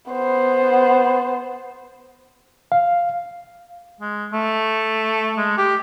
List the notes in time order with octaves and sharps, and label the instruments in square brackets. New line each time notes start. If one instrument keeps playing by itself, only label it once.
[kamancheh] B3 C5
[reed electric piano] F5
[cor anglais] G#3
A3
G#3
G4